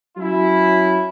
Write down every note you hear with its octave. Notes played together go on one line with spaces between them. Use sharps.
F#3 C#4 E4